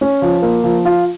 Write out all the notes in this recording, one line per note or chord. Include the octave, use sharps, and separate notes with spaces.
C#4
F3
A#3
F3
F4